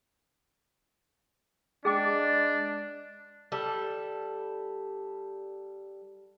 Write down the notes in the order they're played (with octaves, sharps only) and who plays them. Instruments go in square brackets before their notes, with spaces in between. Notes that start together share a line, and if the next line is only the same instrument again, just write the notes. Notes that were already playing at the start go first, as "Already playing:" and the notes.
[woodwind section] G#3 D5 [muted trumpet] D4 [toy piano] G#4 G5 D6
[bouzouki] G3 A4